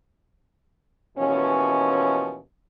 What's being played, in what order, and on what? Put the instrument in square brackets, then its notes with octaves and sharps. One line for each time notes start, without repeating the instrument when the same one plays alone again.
[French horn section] D#2 B2 E3 F3 C#4